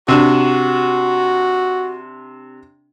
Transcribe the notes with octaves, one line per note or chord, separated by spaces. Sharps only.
C3 D4 F#4